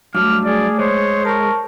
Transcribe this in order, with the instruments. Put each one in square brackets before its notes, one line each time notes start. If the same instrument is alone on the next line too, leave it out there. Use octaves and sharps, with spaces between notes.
[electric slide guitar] G2 F#3 [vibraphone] A3 D6 [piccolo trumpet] F6
[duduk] G#4 [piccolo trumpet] D5
[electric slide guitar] G#3 [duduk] C5 [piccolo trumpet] C#5
[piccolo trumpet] A#4 [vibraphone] A5 C#6